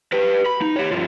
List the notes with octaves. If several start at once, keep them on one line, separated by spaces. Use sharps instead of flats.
G4 B4
B5
D#4
G4 C#5
G2 F3